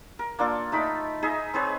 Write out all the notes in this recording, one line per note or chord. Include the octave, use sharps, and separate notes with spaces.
A#4
A#3 D4 F4 A4
A3 D#4 B5 D6
D#4 G#4 D#5 E5
C4 G#4 B4 C#5